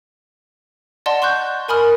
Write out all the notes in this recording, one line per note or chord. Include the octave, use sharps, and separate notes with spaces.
D5 D#5 F#5 A5 C6
C6 C#6 F#6 G6
A#4 G#5 B5 D#6 F6